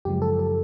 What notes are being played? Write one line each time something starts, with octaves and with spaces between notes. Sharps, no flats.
F#2 C#3 F3 G#3 G4
A4
A4